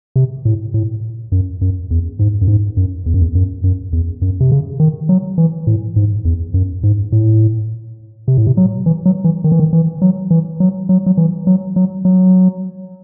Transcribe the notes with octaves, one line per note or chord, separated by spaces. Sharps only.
C3
A2
A2
F#2
F#2
E2
G#2
F#2
G#2
F#2
E2
F#2
E2
F#2
F#2
E2
F#2
C3
C#3
D#3
F#3
E3
A2
G#2
E2
F#2
G#2
A2
C3
A2
C3
F#3
E3
F#3
E3
D#3
E3
D#3
E3
F#3
E3
F#3
F#3
F#3
E3
F#3
F#3
F#3